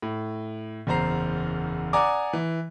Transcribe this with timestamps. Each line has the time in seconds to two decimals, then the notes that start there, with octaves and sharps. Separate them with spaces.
0.02 A2
0.87 F#1 E2 C5 A#5 C7
1.93 D5 F#5 G#5 A#5 D6 D#6
2.33 E3